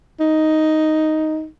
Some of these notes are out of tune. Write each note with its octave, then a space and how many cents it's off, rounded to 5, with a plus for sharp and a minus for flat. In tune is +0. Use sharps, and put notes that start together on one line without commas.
D#4 +5